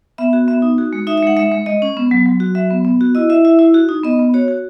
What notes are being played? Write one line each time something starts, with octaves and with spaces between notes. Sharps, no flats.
B3 E5
F#4
B3 E5
D#4
F#4
G#3
D#4 E5
E5
G#3 F#5
G#3 E5
G#3
G#3 D#5
C#4
B3
F#3
F#3
F#4
F#3 E5
B3
B3
F#4
E4 D#5
E4 E5
E4 E5
E4
F#4
D#4
B3 D#5
B3
F#4 C#5
F#4